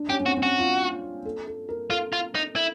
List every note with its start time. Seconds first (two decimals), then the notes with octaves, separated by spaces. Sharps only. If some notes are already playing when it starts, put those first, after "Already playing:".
Already playing: D4
0.10 C#4 G4
0.20 C#4
0.26 C4 F#4
0.37 C4
0.42 C#4 F#4
0.59 F4
1.25 A4
1.47 A4
1.69 A#4
1.90 F4 A4
2.13 F4
2.35 D#4
2.56 E4